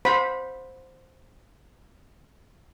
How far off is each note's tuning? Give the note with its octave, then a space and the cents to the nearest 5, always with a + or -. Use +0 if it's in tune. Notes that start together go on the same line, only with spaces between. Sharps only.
C5 +0 F#5 -45 B5 -10